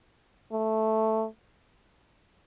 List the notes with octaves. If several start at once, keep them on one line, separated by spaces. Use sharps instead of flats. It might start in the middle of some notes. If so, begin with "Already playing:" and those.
A3